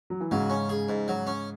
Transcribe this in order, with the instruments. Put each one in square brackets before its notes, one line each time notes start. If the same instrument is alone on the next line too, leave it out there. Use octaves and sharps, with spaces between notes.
[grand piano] F#3
E3
[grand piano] G#2 C#3 [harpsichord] F#3
[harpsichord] C#4
G#4
G#2
F#3
C#4